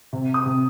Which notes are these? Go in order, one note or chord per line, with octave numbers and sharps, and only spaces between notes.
C3
D#6
C3